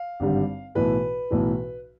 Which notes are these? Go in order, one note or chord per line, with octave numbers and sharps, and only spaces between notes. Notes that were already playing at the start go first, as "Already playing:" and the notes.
Already playing: F5
G#1 G2 D3 G3
B1 A2 E3 B4
B1 A2 E3